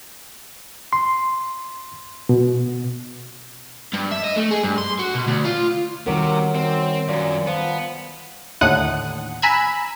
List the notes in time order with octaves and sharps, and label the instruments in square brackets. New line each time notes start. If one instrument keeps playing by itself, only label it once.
[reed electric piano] C6
B2
[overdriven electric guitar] G2
E5
D#5
A3
G#4
G2
C6
F#4
B2
D2
F4
[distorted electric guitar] C3 [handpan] D#3 G3 A#4 [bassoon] F#3
[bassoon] F#2 [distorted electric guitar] C4
[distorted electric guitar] F#2 [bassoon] A#2
[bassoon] F3 [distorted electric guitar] B3
[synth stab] D#2 A2 D3 F#5 D#6 F#6
G#5 A#5 B5 E6 F#6 G#6